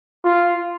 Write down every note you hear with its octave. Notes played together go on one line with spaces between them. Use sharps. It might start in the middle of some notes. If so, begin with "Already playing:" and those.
F4